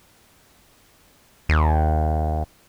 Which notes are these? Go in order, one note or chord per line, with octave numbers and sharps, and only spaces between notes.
D#2